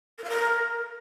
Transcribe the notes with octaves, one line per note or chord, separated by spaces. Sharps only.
A#4
F5
A#4